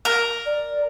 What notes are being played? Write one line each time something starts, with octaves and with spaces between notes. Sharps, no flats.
A#4
D5